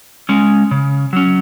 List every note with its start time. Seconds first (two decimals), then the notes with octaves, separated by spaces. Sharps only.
0.29 G#3 C#4
0.71 C#3
1.13 F#3 C#4